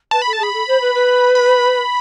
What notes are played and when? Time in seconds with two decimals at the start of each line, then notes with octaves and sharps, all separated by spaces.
0.11 B4 A5
0.22 A4 B5
0.33 A5
0.39 G#4 B5
0.53 A4
0.67 C5
0.81 B4
0.94 B4
1.35 B5